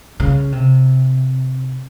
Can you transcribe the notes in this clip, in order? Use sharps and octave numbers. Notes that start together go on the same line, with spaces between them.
C#3
C3